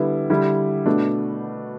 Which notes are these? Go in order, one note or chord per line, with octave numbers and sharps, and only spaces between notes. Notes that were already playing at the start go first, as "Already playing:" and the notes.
Already playing: D3 G3 B3 E4
D3 G3 E4
B2 A3 D4